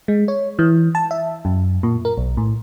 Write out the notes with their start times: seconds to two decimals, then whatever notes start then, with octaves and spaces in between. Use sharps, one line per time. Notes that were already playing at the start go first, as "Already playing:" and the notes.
0.08 G#3
0.28 C#5
0.59 E3
0.95 A5
1.11 E5
1.45 F#2
1.83 A#2
2.05 A#4
2.17 B1
2.37 A2